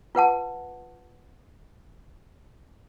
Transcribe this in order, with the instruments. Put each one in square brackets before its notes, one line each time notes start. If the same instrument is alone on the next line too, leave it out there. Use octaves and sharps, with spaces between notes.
[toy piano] F4 B4 F#5 A5